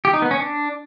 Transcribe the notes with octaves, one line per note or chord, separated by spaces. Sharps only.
G4
D#4
B3
C#4
D4